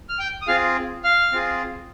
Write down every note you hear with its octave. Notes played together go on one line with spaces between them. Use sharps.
F6
G5 G6
D#6
C4 F4 G#4 F5 F6
F5 F6
C4 F4 G#4